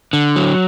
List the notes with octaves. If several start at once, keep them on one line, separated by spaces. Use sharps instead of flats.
D3
F#3